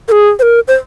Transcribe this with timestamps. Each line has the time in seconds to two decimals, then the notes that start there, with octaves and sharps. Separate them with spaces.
0.08 A#4
0.12 G#4
0.39 C5
0.42 A#4
0.68 C5